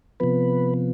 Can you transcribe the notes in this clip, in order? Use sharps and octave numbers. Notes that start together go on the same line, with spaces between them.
C3 F3 B3 B4